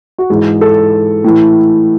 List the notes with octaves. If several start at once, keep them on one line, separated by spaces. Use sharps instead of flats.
F#4
G#2 E3 G#4
A4
A2 E3